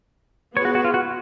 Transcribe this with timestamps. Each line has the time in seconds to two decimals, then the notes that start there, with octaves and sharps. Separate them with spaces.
0.55 B3 F4 G#4 B4 C#5
0.65 F#4
0.75 F#4
0.85 F4
0.94 F#4